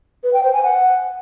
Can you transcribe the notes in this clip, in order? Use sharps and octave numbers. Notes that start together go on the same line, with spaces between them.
B4
G5
C5
G#5
F#5